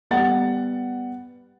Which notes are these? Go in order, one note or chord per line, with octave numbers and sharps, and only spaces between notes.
G3 B3 F#5 A6